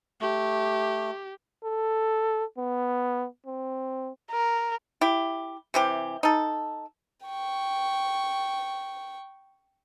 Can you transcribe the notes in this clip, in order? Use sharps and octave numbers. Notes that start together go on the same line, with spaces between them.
A3 G4
A4
B3
C4
A#4
E4 G4
C3 E3 G4
D#4 A4
G5 C#6